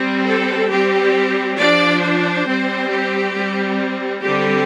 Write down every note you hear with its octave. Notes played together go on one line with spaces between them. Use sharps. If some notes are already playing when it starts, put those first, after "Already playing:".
Already playing: G3 C4
A4
G3 C4 G4
F3 D4 D5
C5
G3 C4
G4
G3 C4
D3 G3 C4 G4